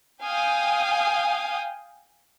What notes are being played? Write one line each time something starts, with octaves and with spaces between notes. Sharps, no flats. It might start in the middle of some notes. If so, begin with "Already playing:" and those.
F5 G5 G#5 D#6